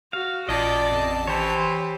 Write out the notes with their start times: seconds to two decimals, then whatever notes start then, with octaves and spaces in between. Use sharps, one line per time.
0.13 F#4 F5
0.49 A1 A#2 D5 D#5 A5
0.91 F2
1.28 E3 G4 C5 C#5